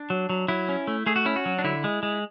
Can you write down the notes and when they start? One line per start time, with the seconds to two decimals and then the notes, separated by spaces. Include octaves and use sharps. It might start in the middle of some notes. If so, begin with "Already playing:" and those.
Already playing: D4
0.10 F#3
0.30 F#3
0.48 F#3 E4
0.69 C#4
0.88 A3
1.06 A3 G#4
1.16 F#4
1.25 C#4 E4
1.36 F#4
1.46 F#3
1.58 D4
1.64 D3 E4
1.84 G#3
2.03 G#3